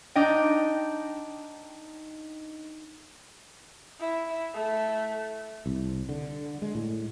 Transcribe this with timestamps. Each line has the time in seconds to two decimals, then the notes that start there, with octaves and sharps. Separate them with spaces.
0.16 D4 D#4 D#5 G5
4.00 E4
4.54 A3
5.66 C2
6.09 D3
6.62 G#3
6.75 A2